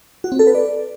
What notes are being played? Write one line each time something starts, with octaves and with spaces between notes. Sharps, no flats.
F#4
C4
A4
B4
D5